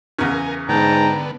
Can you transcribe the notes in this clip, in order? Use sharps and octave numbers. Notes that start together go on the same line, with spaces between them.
E2 C#3 A#4 G#5
G#2 D3 B3 G5 A5 A#5